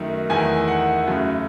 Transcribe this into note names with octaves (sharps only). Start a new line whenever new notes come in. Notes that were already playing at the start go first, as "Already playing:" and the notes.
Already playing: F#2 D#3 A3
E2 D#3 A3 G#5
F#5
F#2 C#3 F#3 A3